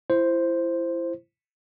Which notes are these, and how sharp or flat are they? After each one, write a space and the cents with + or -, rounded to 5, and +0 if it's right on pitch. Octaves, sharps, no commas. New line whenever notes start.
E4 +25 C5 +0